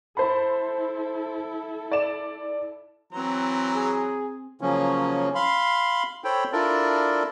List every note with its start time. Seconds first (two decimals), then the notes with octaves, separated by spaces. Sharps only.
0.17 E4 A4 C5 A5 B5
1.92 D5 E7
3.13 E3 F#3 C4 A#5
3.75 G#4
4.61 C#3 F3 F#3 A#3 C#4
5.35 F5 B5 C6
6.24 A4 C5 C#5 G5 B5
6.52 D4 E4 F4 A4 A#4 D5